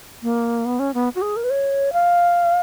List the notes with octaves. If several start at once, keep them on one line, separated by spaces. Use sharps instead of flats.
A#3
B3
C#4
B3
F#4
G#4
A#4
B4
C#5
F5